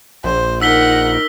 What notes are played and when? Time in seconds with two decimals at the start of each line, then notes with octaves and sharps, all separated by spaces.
0.24 A#1 C5
0.61 D#4 A#4 F#5 E6 B6 G7